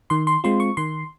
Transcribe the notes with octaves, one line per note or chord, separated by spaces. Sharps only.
D#3 C6
C6
G#3 C4 F4 C6
C#6
D#3 C6